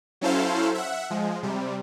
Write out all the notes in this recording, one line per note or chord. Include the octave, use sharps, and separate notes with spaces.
F#3 C#4 E4 A4 C5 F5
E5 F#5
F3 G#3
C3 G3